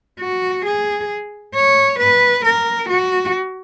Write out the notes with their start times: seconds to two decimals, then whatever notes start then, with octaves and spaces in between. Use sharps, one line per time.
0.20 F#4
0.66 G#4
1.55 C#5
2.00 B4
2.45 A#4
2.90 F#4